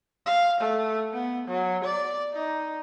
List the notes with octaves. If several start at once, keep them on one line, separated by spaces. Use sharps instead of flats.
F5
A3
B3
F#3
D5
D#4